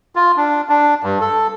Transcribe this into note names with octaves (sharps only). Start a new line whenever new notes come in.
F4
D4
D4
G2
A4